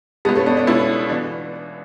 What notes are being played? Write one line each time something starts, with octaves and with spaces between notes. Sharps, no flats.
C#2 B2 G#3 B3
A3 C#4
B3 D4
B3 D4
C#2 B2 C#4 E4
E3 B3 D4